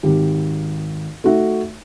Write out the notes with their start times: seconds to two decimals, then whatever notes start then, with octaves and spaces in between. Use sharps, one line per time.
0.03 G#1 G4
1.24 A3 D#4 F#4 E5